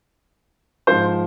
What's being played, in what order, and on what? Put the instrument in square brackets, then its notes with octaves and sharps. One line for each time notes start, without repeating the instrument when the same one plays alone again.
[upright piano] G#2 F3 C5